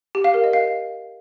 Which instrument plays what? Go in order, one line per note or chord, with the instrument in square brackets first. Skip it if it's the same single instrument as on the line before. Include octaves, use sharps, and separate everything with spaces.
[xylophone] G4
F5
A#4
D#5
F5